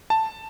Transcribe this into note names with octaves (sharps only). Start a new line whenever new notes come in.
A5